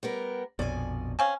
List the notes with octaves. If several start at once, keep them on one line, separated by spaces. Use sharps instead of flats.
G3 B3 A#4
A#1 F2 B2 D5 G#5
C4 C#4 F5 G#5